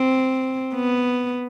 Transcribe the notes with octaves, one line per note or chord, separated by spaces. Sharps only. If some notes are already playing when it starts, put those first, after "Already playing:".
Already playing: C4
B3